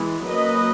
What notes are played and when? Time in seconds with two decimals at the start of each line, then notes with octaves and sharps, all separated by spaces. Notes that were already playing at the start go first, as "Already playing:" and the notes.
Already playing: E3 G#3 B3
0.27 F#3 A#3 C#4 B4 D#5